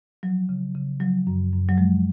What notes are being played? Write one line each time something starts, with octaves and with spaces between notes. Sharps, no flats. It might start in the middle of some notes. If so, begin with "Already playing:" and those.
F3 F#3
C#3
C#3
F3 F#3
F#2
F#2
F#3
F3 G#3